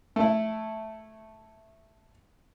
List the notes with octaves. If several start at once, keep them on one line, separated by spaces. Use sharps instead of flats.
A3 E4